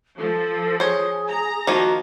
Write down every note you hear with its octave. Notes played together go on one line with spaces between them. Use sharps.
F3 A4
G#4 C5 C#5
A#5
D#3 F3 A#3 F#4